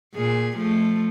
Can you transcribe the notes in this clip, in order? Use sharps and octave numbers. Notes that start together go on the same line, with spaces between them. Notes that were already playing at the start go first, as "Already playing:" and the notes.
A#2 G#4
F3 A3